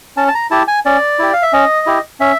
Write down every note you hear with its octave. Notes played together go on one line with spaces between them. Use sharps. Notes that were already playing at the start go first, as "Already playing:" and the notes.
C#4 A5
A5
A#5
E4 G4 A5
G#5
C#4 D5
E4 G4
F5
E5
C#4 D#5
E4 G4
C#4 E5